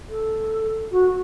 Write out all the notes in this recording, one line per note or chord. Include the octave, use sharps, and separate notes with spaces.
A4
F#4